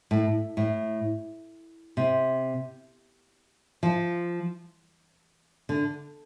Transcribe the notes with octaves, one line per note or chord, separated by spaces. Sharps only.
A2
A2
C3
F3
D3